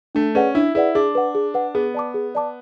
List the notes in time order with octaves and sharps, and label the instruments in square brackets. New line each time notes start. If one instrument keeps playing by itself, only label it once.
[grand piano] A3 [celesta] D4
[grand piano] C#4 [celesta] G#4 B4 D5 F#5
[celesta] D4 [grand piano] E4
[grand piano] E4 [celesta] G#4 B4 D5 F#5
[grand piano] D4 [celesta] G#4
[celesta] B4 F#5
G#4
B4 F#5
[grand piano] B3 [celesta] G#4
[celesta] D5 A5 D6
G#4
D5 A5 D6